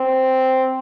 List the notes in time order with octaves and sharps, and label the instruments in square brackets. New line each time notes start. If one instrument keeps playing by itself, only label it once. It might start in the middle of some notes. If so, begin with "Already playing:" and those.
Already playing: [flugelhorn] C4